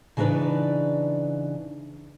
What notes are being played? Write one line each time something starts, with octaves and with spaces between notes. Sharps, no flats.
C#3 E3 D4 D#4 B4 D5